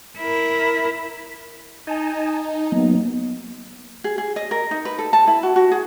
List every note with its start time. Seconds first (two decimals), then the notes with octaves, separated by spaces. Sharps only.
0.18 E4 A#4
1.87 D#4 G#5 A5
2.72 F#3 A#3 B3
4.04 G#4
4.18 G#4
4.36 D#5
4.51 A#4
4.71 D#4
4.85 B4
4.99 A4
5.13 A5
5.27 E4
5.43 F#4
5.56 F#4
5.71 G#4